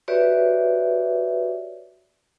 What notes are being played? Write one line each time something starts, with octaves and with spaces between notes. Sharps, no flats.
F#4 G4 B4 C#5 D5 E5